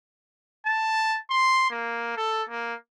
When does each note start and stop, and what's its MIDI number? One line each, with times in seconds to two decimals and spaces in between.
0.66 1.18 81
1.30 1.68 84
1.70 2.16 58
2.17 2.43 69
2.49 2.74 58